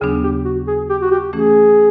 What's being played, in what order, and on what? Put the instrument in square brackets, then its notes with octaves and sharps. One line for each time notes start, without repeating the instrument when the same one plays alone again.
[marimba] D#2 C#3 F#3 B3 D4 [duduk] G#4
[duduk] G4
F#4
G#4
G4
F#4
G4
[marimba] E3 A3 C#4 [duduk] G#4